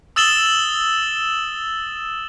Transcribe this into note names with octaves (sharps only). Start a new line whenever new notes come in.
D#6 E6 A6 E7 F#7 G7